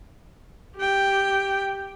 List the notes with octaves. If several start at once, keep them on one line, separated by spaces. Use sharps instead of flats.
G4 G5